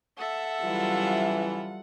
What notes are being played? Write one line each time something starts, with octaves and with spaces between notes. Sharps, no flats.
A4 E5 F#5
C#3 E3 F#3 G3 F4